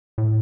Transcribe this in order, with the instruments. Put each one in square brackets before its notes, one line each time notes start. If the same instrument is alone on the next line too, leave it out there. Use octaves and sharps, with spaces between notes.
[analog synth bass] A2